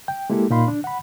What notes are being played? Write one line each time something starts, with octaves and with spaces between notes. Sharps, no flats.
G5
G#3 A#3 E4 G4 A4
A#2 D#4 F5 B5 C6
D4
F#5 B5